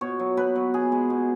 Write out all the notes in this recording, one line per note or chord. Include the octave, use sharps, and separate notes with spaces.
B2 C#5
F#3
B2 B4
F#3
B2 G#4
G#3
B2